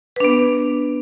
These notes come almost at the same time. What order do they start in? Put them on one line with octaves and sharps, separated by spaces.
B4 D4 B3